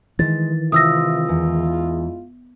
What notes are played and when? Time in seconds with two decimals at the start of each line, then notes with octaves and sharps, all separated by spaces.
0.19 D#3 E3 G#3 A6
0.72 C3 G#3 E4 F4 D#6 E6 A#6
1.29 E2